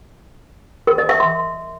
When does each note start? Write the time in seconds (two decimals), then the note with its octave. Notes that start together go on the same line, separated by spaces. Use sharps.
0.87 A#4
0.98 D#5
1.09 E5
1.20 C6